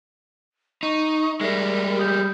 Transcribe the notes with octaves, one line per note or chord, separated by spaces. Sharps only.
D#4 C#6
G3 G#3 A#4 D5 E5 A#6
G4 D#6 G6